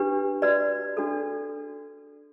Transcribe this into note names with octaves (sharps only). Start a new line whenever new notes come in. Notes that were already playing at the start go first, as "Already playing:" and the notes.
Already playing: D4 G4 B4
F#4 B4 D5
D4 F#4 A4